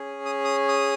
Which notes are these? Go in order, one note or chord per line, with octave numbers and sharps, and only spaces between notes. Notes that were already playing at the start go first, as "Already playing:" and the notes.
Already playing: C#4 G#4
D#6
D#6
D#6